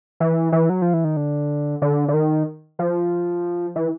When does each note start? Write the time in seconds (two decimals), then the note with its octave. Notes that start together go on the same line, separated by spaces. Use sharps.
0.20 E3
0.52 E3
0.70 F#3
0.82 F3
0.94 E3
1.04 D#3
1.17 D3
1.82 D3
2.08 D3
2.14 D#3
2.79 F3
3.76 E3